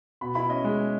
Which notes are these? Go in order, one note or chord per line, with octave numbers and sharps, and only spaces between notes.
B2 B5
E4 B5
C#4 D#5
G#3